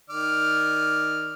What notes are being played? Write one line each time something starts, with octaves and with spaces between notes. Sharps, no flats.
D#3 D5 F6